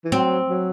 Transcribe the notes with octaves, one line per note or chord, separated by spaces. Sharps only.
E3
F#3 C4
F#3